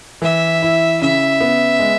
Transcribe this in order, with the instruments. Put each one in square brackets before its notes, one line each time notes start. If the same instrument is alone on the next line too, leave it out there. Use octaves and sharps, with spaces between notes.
[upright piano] E3 [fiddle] E5
[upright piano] E4
[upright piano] C#3 [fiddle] E5
[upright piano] B3
G#3